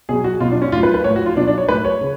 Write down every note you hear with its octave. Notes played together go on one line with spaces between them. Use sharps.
B2 F#3 G#4
F#4
B2 F#3 F4
D4
C#4
A2 F#3 F4
B4
B4
A2 F3 C#5
F#4
F4
B2 F#3 D4
D4
C#5
A2 F#3 B4
C#5
C#3